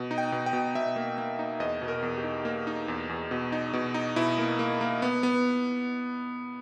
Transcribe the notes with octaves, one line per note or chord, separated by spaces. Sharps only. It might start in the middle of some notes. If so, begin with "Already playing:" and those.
Already playing: B2
D#4
G5
B2
G5
B2
B2 E5
A#3
A#3
D#4
E2 D#5
B2
A#4
E2
G4
D#4
A#3
D#4
E2
E2
B2
D#4
B2
D#4
B2 E4
A#3
A#3
A#3
B3
B3